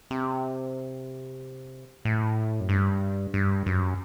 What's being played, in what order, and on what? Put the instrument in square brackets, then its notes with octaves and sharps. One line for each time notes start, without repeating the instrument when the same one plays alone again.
[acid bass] C3
A2
F#2
G2
G2
F#2